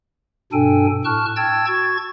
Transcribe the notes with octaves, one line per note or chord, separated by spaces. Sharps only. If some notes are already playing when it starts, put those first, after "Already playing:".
G2 B2 D4 A4 G5 G#5
A2 A5 C#6 F6 F#6
G5 A5 E6 G#6 A6
F#4 C#6 G#6 A6